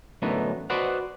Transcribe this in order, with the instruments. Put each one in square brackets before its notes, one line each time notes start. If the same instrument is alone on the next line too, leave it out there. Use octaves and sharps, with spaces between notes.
[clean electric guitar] F#2 A2 D3 E3 B3 D#4
F#4 B4 C5 D5 D#5 F#5